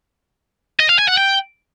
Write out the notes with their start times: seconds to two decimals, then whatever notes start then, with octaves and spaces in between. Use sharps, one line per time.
0.80 D#5
0.89 F5
0.98 G#5
1.08 F#5
1.17 G5